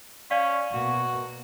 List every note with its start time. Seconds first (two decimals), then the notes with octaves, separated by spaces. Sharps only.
0.31 C#4 D5 F5
0.73 B2 A#3 F#4